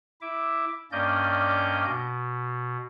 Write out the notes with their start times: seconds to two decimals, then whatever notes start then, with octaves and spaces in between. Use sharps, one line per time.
0.21 E4 E5 D6
0.92 G2 A#3 C#4 D5 D#5 G6
1.87 B2